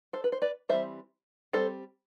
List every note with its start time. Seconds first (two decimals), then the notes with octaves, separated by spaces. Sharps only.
0.13 A4 C5
0.24 B4
0.32 C5
0.42 B4 D5
0.69 E3 G3 C4 C5 E5
1.53 G3 C4 A4 C5